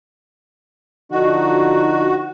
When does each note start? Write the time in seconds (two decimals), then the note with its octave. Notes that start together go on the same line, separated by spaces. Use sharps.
1.11 D3 F3 D#4 F#4